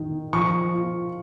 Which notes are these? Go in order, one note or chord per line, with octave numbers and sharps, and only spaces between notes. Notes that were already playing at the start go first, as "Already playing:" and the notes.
Already playing: D#3
F3 C#6
F4